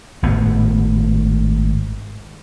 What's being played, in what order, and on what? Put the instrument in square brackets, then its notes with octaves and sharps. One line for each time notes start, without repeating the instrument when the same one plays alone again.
[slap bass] G#1 A2 B3